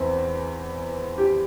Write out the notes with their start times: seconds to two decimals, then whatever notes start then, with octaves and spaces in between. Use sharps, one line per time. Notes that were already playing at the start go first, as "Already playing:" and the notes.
Already playing: E2 E3 C4
1.18 G4